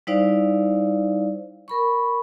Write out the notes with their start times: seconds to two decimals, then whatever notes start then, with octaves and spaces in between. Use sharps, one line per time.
0.07 G3 D#4 E4 C5 D5 F5
1.68 A#4 B5 C#6